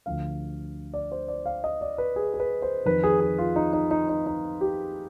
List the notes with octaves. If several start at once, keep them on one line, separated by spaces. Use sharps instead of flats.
D2 D3 F3 F5
D5
C5
D5
F5
D#5
D5
B4
G#4
G#4
B4
C5
F2 D#3 B4
G#4
G#4
F4
D#4
D#4
D#4
D#4
D#4
G4